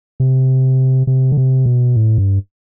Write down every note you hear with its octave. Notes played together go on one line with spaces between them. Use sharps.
C3
C3
D3
C3
B2
A2
G2